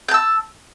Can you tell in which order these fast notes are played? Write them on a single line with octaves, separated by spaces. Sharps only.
G6 A5 E6